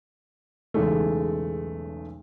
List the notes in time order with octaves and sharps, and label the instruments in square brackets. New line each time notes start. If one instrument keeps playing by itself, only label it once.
[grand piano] B1 E2 C#3 E3 G#3 A3